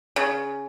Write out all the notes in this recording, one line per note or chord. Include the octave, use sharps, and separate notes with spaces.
C#3